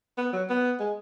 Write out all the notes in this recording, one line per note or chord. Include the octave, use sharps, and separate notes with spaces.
B3
F#3
B3
G#3